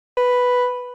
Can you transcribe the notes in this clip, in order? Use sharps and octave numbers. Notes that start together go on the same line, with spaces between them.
B4